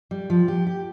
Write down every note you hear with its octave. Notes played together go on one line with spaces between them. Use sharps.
G3
F3
G4
G4